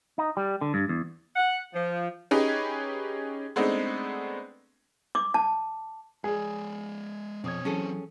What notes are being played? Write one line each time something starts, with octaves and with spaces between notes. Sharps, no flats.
D#4
G3
D3
G2
E2
F#5
F3
C#4 D#4 G4 G#4 B4
G#3 A3 B3 C4 D4 D#4
D6
A5
G#3 G#4 D5
F2 B2 C4 C#5 D#6 G#6
E3 F#3 C#4 G#4 A4